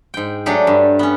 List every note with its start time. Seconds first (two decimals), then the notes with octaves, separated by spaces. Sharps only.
0.14 G#2 G5
0.46 F#3 A3 D4 G4 G#4
0.67 G2
0.99 B3 C#4